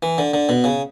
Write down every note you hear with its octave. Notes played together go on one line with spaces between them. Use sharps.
E3
D3
D3
B2
C#3